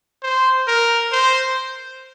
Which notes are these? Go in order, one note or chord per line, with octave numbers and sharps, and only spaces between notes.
C5
A#4
C5